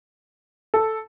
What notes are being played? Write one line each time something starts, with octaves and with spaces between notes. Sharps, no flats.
A4